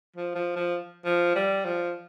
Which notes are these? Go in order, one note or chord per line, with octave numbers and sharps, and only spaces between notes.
F3
F3
F3
F3
G3
F3